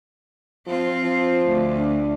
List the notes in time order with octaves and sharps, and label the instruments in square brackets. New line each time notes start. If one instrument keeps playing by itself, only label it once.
[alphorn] F3 [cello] C4 F4
[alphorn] F3
[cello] D2
[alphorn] D4